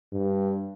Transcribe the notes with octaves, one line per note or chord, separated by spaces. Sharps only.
G2